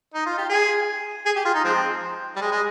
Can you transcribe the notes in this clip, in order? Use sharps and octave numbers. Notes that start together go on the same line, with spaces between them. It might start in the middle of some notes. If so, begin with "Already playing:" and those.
D#4
F4
G4
G#4
G#4
G4
F4
D#4
F3 G#3 C4
G3
G#3
G#3